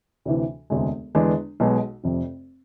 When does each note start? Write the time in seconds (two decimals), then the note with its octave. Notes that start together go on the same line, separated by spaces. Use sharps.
0.25 D2 C3 E3
0.70 E1 D2 C3 G#3
1.15 E2 D3 G#3 B3 D4
1.60 B1 B2 G#3
2.04 F1 F2 C3